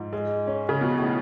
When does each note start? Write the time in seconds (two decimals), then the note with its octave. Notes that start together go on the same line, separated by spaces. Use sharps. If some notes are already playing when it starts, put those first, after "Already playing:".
Already playing: G#2 F3
0.13 G#3
0.47 C#4
0.69 C#3
0.81 B2 F3
0.98 A2